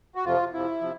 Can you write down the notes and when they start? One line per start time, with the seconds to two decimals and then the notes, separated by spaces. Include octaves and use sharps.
0.15 F#4
0.24 F2 C3 F3 F4
0.53 F2 C3 F3 E4
0.81 C3 F3